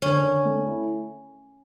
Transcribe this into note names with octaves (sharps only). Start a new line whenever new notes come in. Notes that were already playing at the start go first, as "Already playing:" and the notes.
D3 C#4
D3
A3
E4